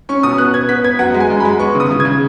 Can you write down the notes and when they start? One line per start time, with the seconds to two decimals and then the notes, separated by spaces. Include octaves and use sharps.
0.09 C#4 C#6
0.23 B2 D#6
0.38 B3 F#6
0.54 B3 G#6
0.69 B3 B6
0.84 B3 G#6
0.99 F#2 F#5
1.14 G#3
1.20 G#5
1.30 F#2
1.40 G#3 B5
1.59 B3 C#6
1.75 C#3
1.80 D#6
1.90 C#3
2.00 G#6
2.05 C#3